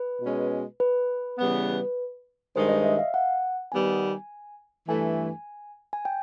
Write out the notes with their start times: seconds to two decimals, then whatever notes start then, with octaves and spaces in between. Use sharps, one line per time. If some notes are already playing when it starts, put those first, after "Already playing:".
Already playing: B4
0.22 B2 G#3 C#4
0.80 B4
1.38 C#3 E3 G3 B3
2.56 G2 D#3 G#3 C5
2.69 D#5
2.84 E5
2.99 F5
3.14 F#5
3.72 D#3 G3 B3 G#5
4.88 G2 E3 A3 G#5
5.93 G#5
6.05 G5